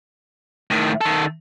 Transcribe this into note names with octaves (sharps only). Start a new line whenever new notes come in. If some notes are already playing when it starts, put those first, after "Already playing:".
A2 D#3
D#3 A4